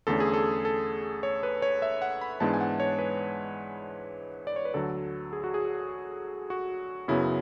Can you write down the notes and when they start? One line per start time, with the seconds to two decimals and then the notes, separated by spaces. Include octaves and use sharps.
0.07 E2 D3 A3 C#4 A4
0.20 G#4
0.34 A4
0.65 A4
1.23 C#5
1.43 B4
1.62 C#5
1.82 E5
2.02 F#5
2.21 B5
2.40 G#2 E3 G#3 B3 D4 A5
2.54 G#5
2.61 F#5
2.80 C#5
2.98 B4
4.47 D5
4.56 C#5
4.65 B4
4.74 D2 D3 F#3 A4
5.33 G#4
5.44 F#4
5.54 G#4
6.50 F#4
7.08 F#2 C#3 F#3 B3 E4